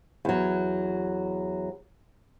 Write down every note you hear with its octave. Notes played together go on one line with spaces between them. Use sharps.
E2 F#3